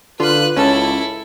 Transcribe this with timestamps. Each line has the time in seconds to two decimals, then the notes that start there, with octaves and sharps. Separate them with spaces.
0.20 D3 F4 B4 F#6
0.56 C#2 C#4 E4 A4